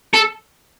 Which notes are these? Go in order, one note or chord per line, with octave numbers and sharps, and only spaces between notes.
A4